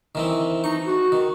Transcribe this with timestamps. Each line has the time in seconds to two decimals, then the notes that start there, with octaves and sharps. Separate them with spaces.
0.15 D#3 E3 C4
0.64 D#4 C#6
0.87 F#4
1.12 D#3